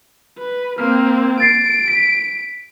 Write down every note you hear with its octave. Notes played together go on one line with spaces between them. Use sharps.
B4
A#3 C4 F6
A6 C7 D7
B6